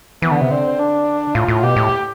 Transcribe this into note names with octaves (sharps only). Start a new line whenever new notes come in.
E3 B3
D3
C3
D3 C4
D4
A2 F4
A2
B2 G4
A2